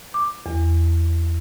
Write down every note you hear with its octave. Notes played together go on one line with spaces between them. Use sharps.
D6
E2